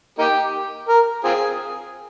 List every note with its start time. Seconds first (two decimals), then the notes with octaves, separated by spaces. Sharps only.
0.19 A#3 D#4 G4
0.89 A#4
1.24 C4 F4 G#4